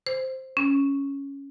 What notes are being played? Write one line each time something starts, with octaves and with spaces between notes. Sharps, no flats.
C5
C#4